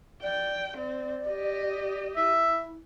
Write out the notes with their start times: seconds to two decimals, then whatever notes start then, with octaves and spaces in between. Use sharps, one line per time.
0.23 D5 G5
0.77 C4 D5
1.28 G4 D#5
2.16 E4 E5